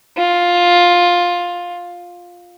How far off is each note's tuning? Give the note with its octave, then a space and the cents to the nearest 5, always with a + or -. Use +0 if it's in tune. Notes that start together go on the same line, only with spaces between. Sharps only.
F4 +10